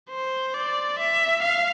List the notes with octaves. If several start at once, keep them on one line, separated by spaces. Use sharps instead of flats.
C5
D5
E5
F5